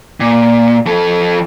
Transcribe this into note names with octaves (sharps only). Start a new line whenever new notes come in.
A#2
F3 A4